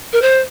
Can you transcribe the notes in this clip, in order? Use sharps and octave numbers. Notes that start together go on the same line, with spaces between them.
A#4
C5